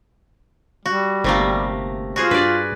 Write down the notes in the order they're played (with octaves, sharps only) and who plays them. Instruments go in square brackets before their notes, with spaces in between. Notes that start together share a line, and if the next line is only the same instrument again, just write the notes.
[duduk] G3 [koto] F#4
[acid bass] G1 [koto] C3 A3 A#3
[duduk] F4 [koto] F#4 G#4 C5
[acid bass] G2 [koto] B4 D5